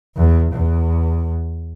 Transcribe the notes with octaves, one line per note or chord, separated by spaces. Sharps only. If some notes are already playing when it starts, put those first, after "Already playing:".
E2
E2